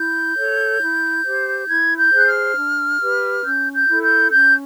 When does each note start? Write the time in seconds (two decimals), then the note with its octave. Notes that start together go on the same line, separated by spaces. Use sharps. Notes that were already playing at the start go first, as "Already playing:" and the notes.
Already playing: E4 G6
0.37 A4 C#5
0.81 E4
1.25 G4 C5
1.69 E4 G#6
1.98 G6
2.12 G#4 C5 F#6
2.27 F6
2.57 D4
3.01 G4 B4
3.44 C#4 G6
3.73 G6
3.88 E4 A4
4.02 G6
4.31 C#4 G6